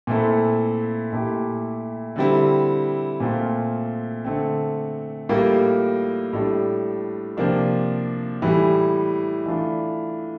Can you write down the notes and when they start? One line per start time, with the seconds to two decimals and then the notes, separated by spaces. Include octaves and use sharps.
0.07 A#2 A3 C4 E4 A4
1.13 A#2 A3 E4 G4
2.16 D3 G3 C4 E4
3.20 A#2 A3 C4 F4
4.24 D3 A3 C4
5.29 A2 G3 A#3 F4
6.33 A2 G3 D4
7.37 C3 F3 A#3 D4 F4
8.42 A2 E3 G3
9.46 E3 A3 D4 F4